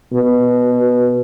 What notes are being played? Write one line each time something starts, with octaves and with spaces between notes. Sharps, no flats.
B2